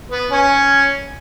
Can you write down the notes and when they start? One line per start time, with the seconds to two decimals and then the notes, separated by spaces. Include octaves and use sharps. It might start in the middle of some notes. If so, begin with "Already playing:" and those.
0.11 B3 B4
0.31 C#4 C#5